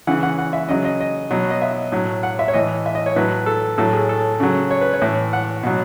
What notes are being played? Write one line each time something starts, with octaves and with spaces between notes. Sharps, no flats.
C#3 E3 F#5
F#5
F#5
E5
C#3 F#3 D#5
D#5
D#5
B2 F#3
D#5
E5
A2 F#3
F#5
E5
C#5
A2 E3 D#5
E5
D#5
C#5
A2 F#3 B4
A4
A2 F#3 A4
G#4
A4
C#3 F#3
C#5
B4
C#5
A2 E3
F#5
B2 F#3